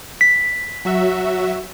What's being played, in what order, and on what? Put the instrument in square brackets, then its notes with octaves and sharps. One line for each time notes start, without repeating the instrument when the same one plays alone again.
[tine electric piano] B6
[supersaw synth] F#3 F#4 E5